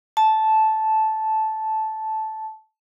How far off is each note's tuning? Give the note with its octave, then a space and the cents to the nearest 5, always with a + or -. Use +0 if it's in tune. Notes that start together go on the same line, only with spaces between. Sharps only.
A5 -10